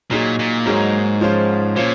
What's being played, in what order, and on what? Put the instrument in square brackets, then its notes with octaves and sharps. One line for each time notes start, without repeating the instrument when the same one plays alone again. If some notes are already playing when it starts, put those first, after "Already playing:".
[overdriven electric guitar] A#2 [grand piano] F#3 A#3 D#4 G#4 C#5
[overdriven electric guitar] A#2
[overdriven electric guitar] G#2 [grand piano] F#3 A#3 D#4 G#4 C#5
[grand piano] F3 G#3 C#4 F4 C5
[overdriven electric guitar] A#2 [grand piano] C#4 F4 C5